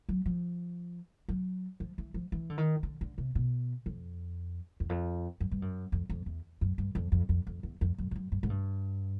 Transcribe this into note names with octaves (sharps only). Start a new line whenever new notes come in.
F#3
F3
F#3
F3
E3
F3
E3
D3
D#3
D3
D3
C3
B2
F2
E2
F2
F#2
G2
F#2
F2
F2
E2
F#2
G2
F2
F2
F2
F2
E2
F2
F#2
F2
F#2
G2
G#2
G2